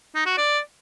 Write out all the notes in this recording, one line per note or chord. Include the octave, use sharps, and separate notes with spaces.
D#4
F#4
D5